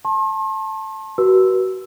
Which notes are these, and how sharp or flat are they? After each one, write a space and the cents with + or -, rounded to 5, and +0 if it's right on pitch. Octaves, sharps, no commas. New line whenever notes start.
A5 +0 C6 +45
F#4 +25 B4 -40 E6 +0